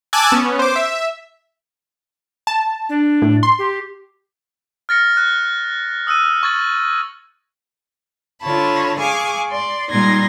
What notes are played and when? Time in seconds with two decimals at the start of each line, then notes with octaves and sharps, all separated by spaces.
0.13 G#5 A5 D6 E6 F#6 G#6
0.32 B3 C#4
0.59 C5 D6
0.76 E5
2.47 A5
2.89 D4
3.22 A2
3.43 C6
3.59 G4
4.89 F6 A6 A#6 C#7
5.17 F#6
6.07 D#6 E6 F#6 D#7
6.43 C#6 G#6 A6 F#7
8.41 D3 F4 C#5 A5 B5
8.99 G#4 F5 G#5 C#6 D6
9.50 D5 C6
9.90 A#2 G3 D#4 C6 G#6 A#6